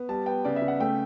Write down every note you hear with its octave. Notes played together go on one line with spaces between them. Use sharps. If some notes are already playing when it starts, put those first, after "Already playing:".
Already playing: B3
G3 A5
B3 G5
C#3 D5
E5
C#3
F#5
A3 G5